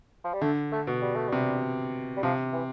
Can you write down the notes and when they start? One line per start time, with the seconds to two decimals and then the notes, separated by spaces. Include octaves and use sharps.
0.24 F3
0.33 G3
0.41 D3 A3
0.72 A3
0.87 B2
1.02 G3
1.16 A3
1.29 C3 G3
2.17 G3
2.23 C3 F3
2.53 E3